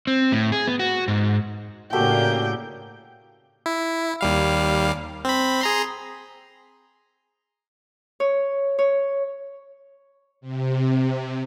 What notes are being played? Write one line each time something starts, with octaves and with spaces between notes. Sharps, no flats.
C4
A2
G#4
B3
F#4
G#2
A2 C#3 A#3 D4 F#4 G4 A4 G5
E4
D#2 G3 F5
C4 B5
G#4 A#5 C6
C#5
C#5
C3